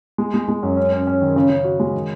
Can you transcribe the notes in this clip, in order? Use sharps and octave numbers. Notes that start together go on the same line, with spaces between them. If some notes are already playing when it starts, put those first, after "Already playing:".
G#3
G#3
G#3
F#2
C#4
C#4
C#4
D#3
C#3
C#3
F#4
G#3
D#3